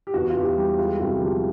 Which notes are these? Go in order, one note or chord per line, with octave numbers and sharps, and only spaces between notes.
G4
E2 F#4
F4
E2 G4
F#4
G3
G#3 F4
C2 F#4
F3 G4